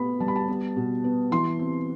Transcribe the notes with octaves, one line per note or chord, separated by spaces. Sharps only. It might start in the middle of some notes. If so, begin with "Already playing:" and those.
Already playing: B2 A3 B3 B5
G3 A5
B5
A5
B3
B2
B3
E3 C6
C4